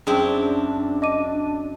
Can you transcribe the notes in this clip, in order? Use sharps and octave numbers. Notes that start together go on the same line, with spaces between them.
F#2 C4 D4 E4 G#4 G5
D#5 D6 D#7